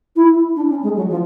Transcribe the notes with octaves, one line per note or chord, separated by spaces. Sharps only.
E4
D4
C#4
G#3
F#3
F3